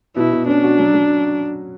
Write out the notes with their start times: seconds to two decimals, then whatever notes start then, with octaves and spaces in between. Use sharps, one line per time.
0.16 B2 E4
0.32 B2
0.47 C#4 D4
0.63 F#4
0.79 F#3
0.94 F#3